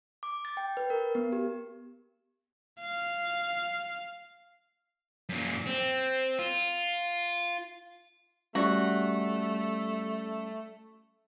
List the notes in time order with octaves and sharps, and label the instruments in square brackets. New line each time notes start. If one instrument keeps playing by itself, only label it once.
[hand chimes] D6
A6
G5
B4
A#4
B3
G4
[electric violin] F5
[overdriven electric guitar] F#2 A#2
C4
F4
[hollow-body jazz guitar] G3 [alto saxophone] A3 [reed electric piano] C#4 D5 [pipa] F#4